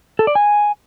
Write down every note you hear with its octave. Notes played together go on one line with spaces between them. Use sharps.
A4
D5
G#5